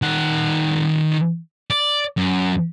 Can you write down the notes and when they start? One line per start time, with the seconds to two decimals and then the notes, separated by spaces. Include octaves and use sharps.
0.02 D#3 F#5
1.70 D5
2.17 F#2